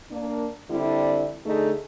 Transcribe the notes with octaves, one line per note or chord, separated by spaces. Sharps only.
A#3 D4
D3 G3 C4 E4
D3 A3 D#4 G#4